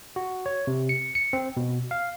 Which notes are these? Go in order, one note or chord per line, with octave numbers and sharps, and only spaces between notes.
F#4
C#5
C3
C#7
C#7
C4
B2
F5